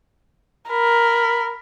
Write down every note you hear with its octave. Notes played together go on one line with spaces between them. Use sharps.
A#4 B5